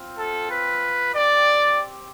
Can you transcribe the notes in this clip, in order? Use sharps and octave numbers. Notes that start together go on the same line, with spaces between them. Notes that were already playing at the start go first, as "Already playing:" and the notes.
Already playing: C4 F4
A4
B4
C4 G4 D5